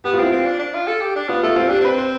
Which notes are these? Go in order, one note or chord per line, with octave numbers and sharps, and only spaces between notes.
B3 G4
F4
C4 E4
C4 F4
D4
D4
F4
A4
G4
D4
B3 F4
A3 F4
C4 F4
D4 G4
C4 B4
C5